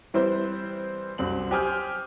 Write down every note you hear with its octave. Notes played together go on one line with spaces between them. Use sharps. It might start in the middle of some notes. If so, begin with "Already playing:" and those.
E3 G3 C4 E4 B4 C5
C2 F#2 C4 F#7
G4 C5 G#5 D#6 F6 G6